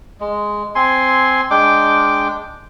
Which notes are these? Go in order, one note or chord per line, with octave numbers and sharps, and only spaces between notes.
G#3
C4 G#5 C6
G#3 D4 G5 D6